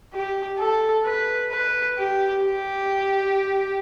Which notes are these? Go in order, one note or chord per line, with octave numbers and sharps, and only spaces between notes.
G4
A4
B4
B4
G4
G4